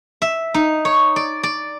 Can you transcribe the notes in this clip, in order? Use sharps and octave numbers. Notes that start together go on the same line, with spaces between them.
E5
D#4
C#5
D5
D5